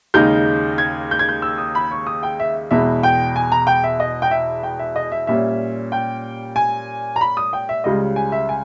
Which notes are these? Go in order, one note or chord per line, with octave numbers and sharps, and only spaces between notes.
D#2 C#3 G#3 D#4 G6
G#6
G6
G#6
G6
E6
D#6
B5
C#6
D#6
G5
E5
E2 B2 G#3 E5
G5
G#5
A#5
G5
E5
D#5
G5
E5
G5
E5
D#5
E5
A#2 G3 C#4 E5
G5
G#5
A#5
B5
D#6
G5
E5
C#2 C#3 G3 D#5
G#5
E5
G#5